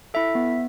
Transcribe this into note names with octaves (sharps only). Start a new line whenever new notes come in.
E4 A4 E5
B3